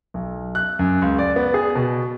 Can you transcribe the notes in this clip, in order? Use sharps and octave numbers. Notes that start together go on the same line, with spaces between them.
B1
F#6
F#2
C#2
D5
B3
G#4
B2